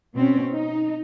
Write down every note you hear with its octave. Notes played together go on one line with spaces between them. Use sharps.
B2 C4 C#4
D#4